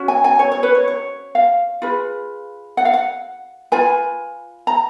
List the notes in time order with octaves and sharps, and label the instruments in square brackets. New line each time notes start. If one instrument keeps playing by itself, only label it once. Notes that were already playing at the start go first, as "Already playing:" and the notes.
Already playing: [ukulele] C#4 F#4
G#5
G#5
C#5
C#5
B4
C#5
C#5
F5
F4 G#4 B4
F#5
F5
F#5
F4 B4 G#5
A#5